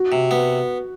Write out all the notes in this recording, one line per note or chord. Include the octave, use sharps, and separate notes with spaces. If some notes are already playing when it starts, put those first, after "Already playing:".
Already playing: F#4
C3
B3